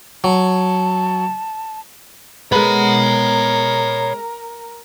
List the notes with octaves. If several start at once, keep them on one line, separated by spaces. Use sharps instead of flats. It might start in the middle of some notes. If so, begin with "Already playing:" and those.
F#3 A5
G#3 B3 A#4 C#5 B5